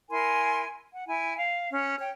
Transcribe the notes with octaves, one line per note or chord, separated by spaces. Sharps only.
E4 A#4 G#5 C6
F#5
E4 G#5
F5
C#4
C#5 G5